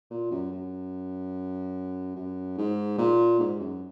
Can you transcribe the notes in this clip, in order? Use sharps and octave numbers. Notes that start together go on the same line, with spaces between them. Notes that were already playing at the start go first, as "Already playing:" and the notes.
A#2
F#2
F#2
F#2
G#2
A#2
G#2
F#2